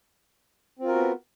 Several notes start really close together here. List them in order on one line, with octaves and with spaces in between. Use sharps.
C4 F4 A#4 F#4 B3